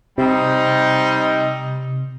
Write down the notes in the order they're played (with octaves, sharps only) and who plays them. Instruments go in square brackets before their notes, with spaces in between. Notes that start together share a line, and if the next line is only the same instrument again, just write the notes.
[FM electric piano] C3 [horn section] G3 C4 D#4